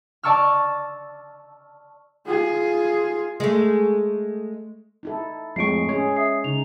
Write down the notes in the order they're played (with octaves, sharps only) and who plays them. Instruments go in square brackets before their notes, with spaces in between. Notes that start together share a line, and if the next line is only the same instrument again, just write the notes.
[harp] D5 A5 C#6 E6 F6
[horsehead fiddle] F4 G#4
[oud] G#3 A3
[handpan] D#4 E4 A4
[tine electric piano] F2 A2 C#6 [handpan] G#3 [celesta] C7 D7
[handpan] C#4 G#4 [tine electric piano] C#5
[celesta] E5 D#6 C7
[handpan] C#3 D#4 [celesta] F7